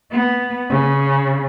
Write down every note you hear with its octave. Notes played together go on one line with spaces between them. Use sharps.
B3
C#3